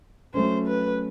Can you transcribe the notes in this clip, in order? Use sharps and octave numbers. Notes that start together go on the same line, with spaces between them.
F#3 A3 C#4 C5
B4